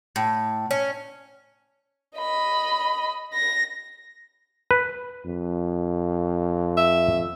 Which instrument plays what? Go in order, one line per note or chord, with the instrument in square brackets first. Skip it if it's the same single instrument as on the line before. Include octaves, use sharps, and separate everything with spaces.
[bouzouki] A2
C#4
[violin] D#5 B5
A#6
[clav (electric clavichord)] B4
[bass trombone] F2
[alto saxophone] E5